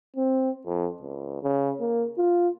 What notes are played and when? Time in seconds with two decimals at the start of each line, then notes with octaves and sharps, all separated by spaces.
0.17 C4
0.66 F2
1.01 C#2
1.43 C#3
1.81 A#3
2.18 F4